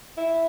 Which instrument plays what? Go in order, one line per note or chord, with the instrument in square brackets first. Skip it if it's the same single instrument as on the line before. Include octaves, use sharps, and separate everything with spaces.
[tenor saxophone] E4